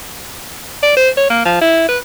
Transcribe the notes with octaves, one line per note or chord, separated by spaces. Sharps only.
D5
C5
C#5
A#3
F3
E4
B4